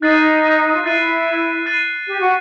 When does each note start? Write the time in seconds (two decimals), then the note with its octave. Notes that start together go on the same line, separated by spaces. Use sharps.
0.01 D#4 F#6 A6 C7 D#7
0.75 F4
0.84 E4 F#6 A6 C7 D#7
1.66 F#6 A6 C7 D#7
2.07 G4
2.20 F#4